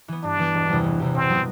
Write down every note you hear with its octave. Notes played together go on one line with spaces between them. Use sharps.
E3 B3
G2 D4
E3 B3
E1
E2 C3 G3
E1
E2 C3 G3
B2 C4
F#3 B3 F#4